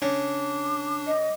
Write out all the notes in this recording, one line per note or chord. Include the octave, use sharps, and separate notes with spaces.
C#3 D4 D6
D#5